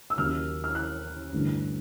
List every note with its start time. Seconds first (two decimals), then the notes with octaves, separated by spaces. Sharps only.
0.10 E6
0.18 D#2 C#3 F#3 A#3 F6
0.64 F6
0.75 F#6
1.33 A1 G2 D3